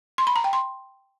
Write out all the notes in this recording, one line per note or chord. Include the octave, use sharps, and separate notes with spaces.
C6
B5
A#5
G5
C6